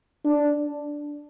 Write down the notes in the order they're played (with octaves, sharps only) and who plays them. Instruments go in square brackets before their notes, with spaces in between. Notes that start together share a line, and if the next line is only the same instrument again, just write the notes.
[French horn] D4